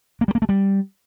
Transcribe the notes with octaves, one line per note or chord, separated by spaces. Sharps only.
A#3
G3
A#3
A3
G3